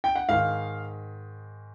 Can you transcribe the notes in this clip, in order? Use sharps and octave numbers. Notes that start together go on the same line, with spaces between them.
G5
F#5
G#2 D#3 F5